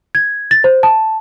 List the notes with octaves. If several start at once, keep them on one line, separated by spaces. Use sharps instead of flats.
G#6
A6
C5
A5